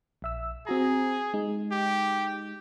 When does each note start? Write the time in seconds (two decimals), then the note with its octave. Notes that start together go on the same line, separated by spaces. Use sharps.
0.22 A#1 E5 E6
0.67 C4 F#4 G#4 A#5
1.34 G#3 D#4
1.72 G4